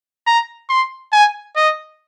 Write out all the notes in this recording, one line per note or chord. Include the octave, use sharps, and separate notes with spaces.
A#5
C6
G#5
D#5